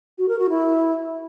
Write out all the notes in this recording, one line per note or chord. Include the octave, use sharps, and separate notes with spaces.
F#4
A#4
F#4
E4